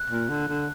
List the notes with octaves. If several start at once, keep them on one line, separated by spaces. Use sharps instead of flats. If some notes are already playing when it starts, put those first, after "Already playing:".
Already playing: F#6
A#2
D3
D3